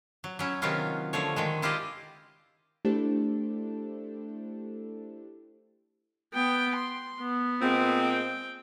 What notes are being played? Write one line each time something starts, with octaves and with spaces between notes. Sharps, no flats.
F#3
F#3 C#4 E4
C3 D#3 F#3 B3 C#4 F4
D3 F3 A3 C#5
D#3 F#3 G#3
E4 F4 G4 D5 D#5
A3 D4 E4 G4 A4 C5
B3 G5
C6
B3
A#2 G#3 C4
G5